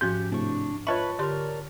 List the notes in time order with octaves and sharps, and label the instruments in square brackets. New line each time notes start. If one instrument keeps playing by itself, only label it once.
[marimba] G#2 F3 F#4 [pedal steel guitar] C#4 G4 G6
[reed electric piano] A2 C3 [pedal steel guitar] D4 C#6
[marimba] F4 D#5 E5 [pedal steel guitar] B4 B5 [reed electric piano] C#5 A5 C#6
[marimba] D3 G4 C6 [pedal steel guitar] A#4 D5